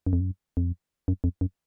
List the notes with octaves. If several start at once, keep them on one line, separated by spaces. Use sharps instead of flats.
F#2
F2
F#2
F2
F#2
F2
F#2